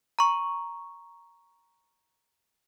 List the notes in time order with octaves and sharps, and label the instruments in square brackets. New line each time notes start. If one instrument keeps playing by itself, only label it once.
[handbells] A#5 C#6